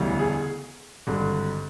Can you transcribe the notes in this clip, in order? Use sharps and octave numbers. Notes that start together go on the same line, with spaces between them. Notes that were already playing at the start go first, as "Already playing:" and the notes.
Already playing: E1 D2 C#3 E3 G3
G#4
G#1 G2 D3